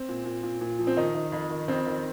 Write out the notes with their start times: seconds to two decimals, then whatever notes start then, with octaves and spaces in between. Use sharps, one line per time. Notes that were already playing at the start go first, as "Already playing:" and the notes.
Already playing: C4
0.09 A#2
0.25 A#2
0.43 A#2
0.61 A#2
0.78 F3
0.87 C4
0.97 D#3 D#4
1.14 D#3
1.32 F2
1.50 D#3
1.68 F2 C4
1.86 D#3